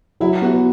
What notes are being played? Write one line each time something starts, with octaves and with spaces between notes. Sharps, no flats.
F#3 E4
B3 F#4